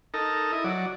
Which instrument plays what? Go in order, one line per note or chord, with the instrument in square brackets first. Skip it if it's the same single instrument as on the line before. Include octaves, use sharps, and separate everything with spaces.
[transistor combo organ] D#4 A4 A#4
E4 D#5
F#3 D5